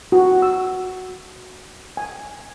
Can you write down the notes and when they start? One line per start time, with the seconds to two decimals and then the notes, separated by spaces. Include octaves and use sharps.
0.12 F#4
0.42 E6
1.97 G#5